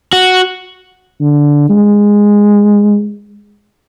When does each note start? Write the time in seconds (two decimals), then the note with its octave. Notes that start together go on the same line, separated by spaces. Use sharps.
0.13 F#4
1.21 D3
1.70 G#3